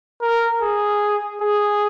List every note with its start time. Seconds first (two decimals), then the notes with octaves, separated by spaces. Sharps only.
0.21 A#4
0.61 G#4
1.41 G#4